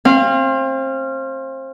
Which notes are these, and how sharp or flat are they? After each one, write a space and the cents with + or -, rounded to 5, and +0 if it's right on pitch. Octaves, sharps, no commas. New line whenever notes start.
C4 +30 F5 -20